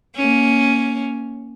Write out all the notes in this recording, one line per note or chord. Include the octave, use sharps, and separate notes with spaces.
A#3 C#4